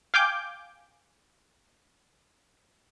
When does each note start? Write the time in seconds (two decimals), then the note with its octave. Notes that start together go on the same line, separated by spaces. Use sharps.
0.14 F5 G5 G#5 D6 G6